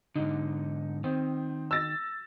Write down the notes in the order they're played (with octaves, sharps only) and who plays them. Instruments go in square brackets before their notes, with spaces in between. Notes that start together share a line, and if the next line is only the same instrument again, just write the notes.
[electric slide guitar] G#2 D3 [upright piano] D#4
[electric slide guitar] D#3 [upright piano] C4
[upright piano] E6 A6 A#6